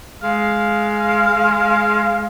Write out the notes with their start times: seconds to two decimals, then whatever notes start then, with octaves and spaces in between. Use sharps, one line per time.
0.23 G#3 F5